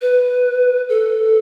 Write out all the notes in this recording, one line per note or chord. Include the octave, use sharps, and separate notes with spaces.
B4
A4